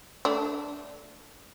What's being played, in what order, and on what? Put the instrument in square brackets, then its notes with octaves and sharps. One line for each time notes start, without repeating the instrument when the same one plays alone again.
[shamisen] A3 D4